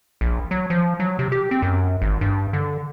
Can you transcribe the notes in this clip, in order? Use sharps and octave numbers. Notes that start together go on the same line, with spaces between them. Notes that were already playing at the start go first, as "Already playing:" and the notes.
A#1
F#3
F3
F#3
C3
G4
C4
F#2
G#1
G2
D3